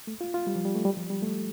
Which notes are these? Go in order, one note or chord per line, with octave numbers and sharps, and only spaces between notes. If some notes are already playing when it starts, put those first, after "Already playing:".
A3
F4
F4
G3
F3
G3
A3
G3
F3
G3
A3